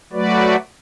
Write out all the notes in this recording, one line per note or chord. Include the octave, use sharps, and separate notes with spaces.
F#3 A3 F#4 B4 D5